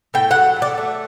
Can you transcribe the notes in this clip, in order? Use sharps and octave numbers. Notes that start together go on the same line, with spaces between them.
A2 G5
F#5
F#3
A3
D5
A3